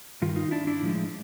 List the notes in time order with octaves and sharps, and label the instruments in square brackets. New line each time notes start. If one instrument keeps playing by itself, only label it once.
[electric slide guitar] G2 D#3 F4
D#4 F4
D4 E4
D4 E4
A2 F3 G#3